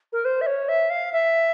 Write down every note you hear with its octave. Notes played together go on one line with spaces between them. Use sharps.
A#4
C5
E5
C#5
E5
F5
E5